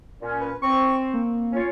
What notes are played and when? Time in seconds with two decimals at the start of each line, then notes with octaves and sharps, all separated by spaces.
0.20 A#2 C#4
0.40 B4
0.62 C4 C#6
1.13 A#3
1.52 C#4 F4 C#5